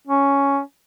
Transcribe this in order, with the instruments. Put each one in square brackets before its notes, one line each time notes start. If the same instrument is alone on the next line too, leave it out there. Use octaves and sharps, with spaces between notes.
[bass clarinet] C#4